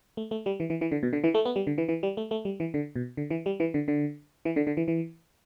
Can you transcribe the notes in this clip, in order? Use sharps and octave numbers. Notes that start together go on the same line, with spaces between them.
A3
A3
G3
E3
E3
E3
D3
B2
D3
E3
A3
B3
G3
D3
E3
E3
G3
A3
A3
G3
E3
D3
B2
D3
E3
G3
E3
D3
D3
E3
D3
D3
E3
E3